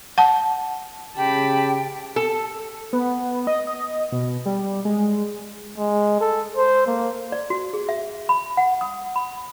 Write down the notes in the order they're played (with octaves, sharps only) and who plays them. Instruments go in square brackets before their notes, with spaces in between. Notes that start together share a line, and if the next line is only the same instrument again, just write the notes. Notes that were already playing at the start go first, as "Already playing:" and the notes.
[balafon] F#5 A5
[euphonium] C#3 [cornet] G4 [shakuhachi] G5 [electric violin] A5 B5
[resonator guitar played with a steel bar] A4
[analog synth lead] B3
D#5
D#5
B2
G3
G#3
[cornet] G#3
A4
C5
A#3
[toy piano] D5
F#4
G#4
E5
B5
F#5
D#6
B5